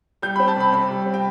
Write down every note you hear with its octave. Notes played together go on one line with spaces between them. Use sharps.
G3 G6
C4 B5
A5
C3 B5
C3 B5
G3
C4
G5